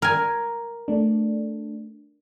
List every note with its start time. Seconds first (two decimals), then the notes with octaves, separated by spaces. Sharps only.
0.02 A#4 G#5
0.88 A3 D4